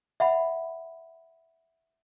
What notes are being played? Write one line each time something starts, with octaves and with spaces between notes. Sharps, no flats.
E5 F#5 B5